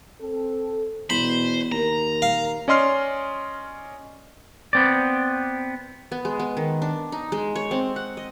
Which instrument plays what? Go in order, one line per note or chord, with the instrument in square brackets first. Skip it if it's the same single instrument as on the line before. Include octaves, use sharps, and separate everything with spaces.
[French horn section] C4 A4
[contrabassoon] E2 [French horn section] B2 [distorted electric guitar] C5 [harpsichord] B5
[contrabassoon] D#2 [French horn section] A#4 [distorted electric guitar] A#5
[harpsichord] F5
[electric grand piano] C#4 D5 D#5 C6 F6 C7
[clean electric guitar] B3 C4 D5
[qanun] B3
G#3
B3
D#3
D4
D#4
G#3
C#5
C4
F#5
D#5